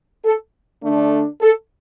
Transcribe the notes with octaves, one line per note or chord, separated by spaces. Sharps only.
A4
D3 A3 D4
A4